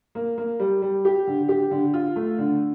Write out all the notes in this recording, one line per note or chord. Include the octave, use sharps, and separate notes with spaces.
A#3
A#3
G3
G3
G4
D3
G4
D3
F4
A3
D3